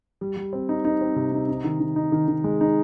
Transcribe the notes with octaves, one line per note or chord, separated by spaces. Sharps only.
G3
G3
C4
D#4
D#4
C4
C3
D#4
D#4
D#3
D#3
D#4
D#3
D#3
G#3
D#4